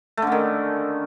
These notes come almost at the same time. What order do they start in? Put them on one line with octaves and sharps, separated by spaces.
A3 D3 C#4 D#3